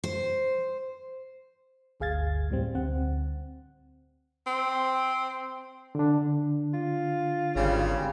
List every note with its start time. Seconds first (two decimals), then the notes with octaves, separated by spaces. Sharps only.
0.04 C5
2.00 G1 D2 G#4 F5 G#6 A6
2.50 F2 A2 G3 C4
2.74 D2 C4 F#5
4.47 C4
5.95 D3 D4
6.74 F4
7.56 G#1 C#3 G3